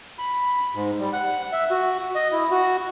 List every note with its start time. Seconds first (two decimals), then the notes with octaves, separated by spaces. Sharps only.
0.19 B5
0.75 G#2
0.99 G3
1.13 F#5
1.52 E5
1.71 F#4
2.15 D#5
2.32 E4
2.51 F#4